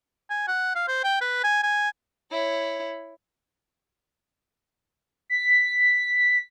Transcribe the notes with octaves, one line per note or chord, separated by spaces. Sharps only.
G#5
F#5
F5
C5
G5
B4
G#5
G#5
E4 C#5
B6